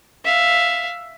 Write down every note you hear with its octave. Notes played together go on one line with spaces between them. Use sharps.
E5 F5